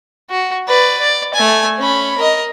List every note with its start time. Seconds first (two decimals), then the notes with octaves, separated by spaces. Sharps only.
0.30 F#4
0.68 B4 D5
1.00 D5
1.34 A3 G#5
1.78 C#4 B5
2.18 A#4 D#5